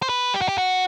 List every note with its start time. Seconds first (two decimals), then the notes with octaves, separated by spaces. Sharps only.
0.02 C5
0.09 B4
0.34 G4
0.41 F#4
0.48 G4
0.58 F#4